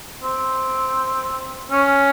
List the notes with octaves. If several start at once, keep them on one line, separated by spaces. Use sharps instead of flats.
C4
C#4